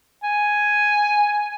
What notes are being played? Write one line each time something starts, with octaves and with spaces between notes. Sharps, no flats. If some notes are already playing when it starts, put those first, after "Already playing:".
G#5